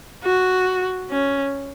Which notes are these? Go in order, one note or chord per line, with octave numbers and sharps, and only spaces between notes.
F#4
C#4